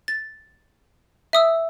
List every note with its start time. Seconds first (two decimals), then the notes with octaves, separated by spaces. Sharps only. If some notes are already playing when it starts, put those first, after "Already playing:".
0.08 A6
1.33 E5 D#6 E6